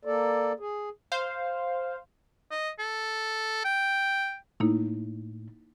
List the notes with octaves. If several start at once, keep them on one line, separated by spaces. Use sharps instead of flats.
A#3 A4 D5
G#4
C5 F5
D#5
A4
G5
A2 A#3 D#4 E4